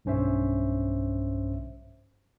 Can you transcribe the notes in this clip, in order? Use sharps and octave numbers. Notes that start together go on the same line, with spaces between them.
B1 G2 C#4 C5 E5